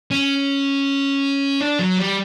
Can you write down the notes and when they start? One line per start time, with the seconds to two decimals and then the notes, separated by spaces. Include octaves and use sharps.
0.11 C#4
1.61 D4
1.79 F#3
1.97 G3